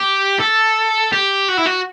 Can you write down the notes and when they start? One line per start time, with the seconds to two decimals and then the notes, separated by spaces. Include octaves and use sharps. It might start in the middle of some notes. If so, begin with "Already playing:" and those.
Already playing: G4
0.40 A4
1.12 G4
1.48 F#4
1.57 E4
1.66 F#4